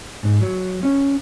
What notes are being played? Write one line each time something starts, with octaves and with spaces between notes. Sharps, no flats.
G#2
F#3
C#4